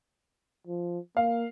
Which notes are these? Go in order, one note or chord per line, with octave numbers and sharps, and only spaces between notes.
F3
A#3 F5